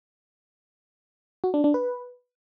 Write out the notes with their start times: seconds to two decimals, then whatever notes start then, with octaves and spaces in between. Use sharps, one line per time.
1.44 F#4
1.54 D4
1.64 D4
1.74 B4